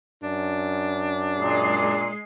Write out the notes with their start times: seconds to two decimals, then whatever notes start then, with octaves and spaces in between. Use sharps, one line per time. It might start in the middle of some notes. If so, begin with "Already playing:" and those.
0.23 F#2 D4
1.40 A#2 G#3 C7